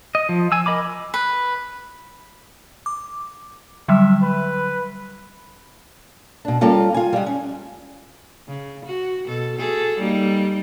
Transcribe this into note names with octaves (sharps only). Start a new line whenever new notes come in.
D#5
F3
G#5 E6
A#4 D#5 B5 D6
B4
D6
D3 F#3 G3 E5
B4
B2 D4
G3 A#3 C#4 F4 A4
F4 G#5
G3 G#3
C#4
C#3
F#4
B2 A4
F#4 G#4 A4
G3 A#3 D#4